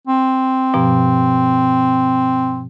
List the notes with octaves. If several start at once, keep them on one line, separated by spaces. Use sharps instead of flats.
C4
G2 B2 F3